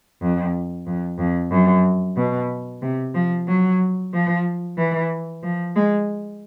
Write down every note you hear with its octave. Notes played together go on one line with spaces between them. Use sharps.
F2
F2
F2
F#2
B2
C3
F3
F#3
F3
E3
F3
G#3